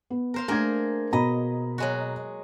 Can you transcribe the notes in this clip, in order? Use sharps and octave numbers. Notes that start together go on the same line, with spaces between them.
B3
A#4 C5 F5
A3 A#3 D4 G#4 A#4 G#6
B2 D#5 A#5 B5
F#3 G#3 F#4